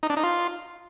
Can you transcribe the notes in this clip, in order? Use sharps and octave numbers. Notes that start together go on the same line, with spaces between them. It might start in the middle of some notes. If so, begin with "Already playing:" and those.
D#4
D4
D#4
F4